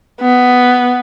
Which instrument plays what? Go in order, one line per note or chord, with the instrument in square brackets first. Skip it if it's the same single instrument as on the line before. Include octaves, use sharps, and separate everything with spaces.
[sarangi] B3